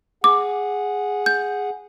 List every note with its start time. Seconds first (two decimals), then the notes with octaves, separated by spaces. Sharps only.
0.24 G#4 F#5 D6
1.26 G6